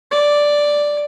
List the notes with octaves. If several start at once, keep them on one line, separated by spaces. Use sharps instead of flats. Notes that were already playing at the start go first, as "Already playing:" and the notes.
D5